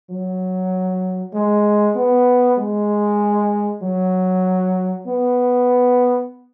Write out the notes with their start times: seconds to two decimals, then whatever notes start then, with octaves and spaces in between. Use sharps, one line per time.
0.10 F#3
1.34 G#3
1.96 B3
2.58 G#3
3.82 F#3
5.07 B3